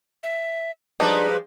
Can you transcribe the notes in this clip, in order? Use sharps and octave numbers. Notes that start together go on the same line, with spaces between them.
E5
F3 G3 G#3 D4 D#4 B4